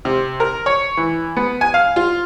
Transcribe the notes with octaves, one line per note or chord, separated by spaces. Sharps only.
C3
A#4
C#5
E3
B3
G#5
F5
F4